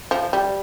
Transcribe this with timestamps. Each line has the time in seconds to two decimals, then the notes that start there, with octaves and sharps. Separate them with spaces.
0.11 F3
0.33 G3